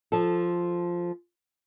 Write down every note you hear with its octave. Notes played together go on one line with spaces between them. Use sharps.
F3 A4